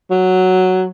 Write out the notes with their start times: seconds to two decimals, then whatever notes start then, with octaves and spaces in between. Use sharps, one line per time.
0.11 F#3